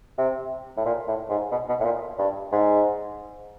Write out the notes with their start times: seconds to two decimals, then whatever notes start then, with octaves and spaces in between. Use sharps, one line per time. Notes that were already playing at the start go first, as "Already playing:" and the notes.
0.18 C3
0.77 A2
0.86 A#2
1.08 A2
1.30 G#2
1.51 B2
1.69 B2
1.80 A2
1.85 A#2
2.18 G2
2.52 G#2